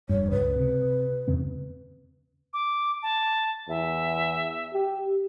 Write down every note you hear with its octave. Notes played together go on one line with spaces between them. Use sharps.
F1 G2 C#5
C#2 B4
C3
E2 C#3 C4
D6
A5
E2 E5
G4